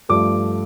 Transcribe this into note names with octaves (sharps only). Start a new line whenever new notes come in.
G2 F3 A3 D6